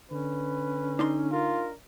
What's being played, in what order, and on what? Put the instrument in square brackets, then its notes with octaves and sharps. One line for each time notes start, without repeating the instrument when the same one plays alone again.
[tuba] D3 [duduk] C#4 [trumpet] B4
[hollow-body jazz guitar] D4 D#4 C6
[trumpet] F4 [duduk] A#4